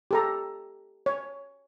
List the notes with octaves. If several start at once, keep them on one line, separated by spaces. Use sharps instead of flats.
G4 A4 A#5
C#5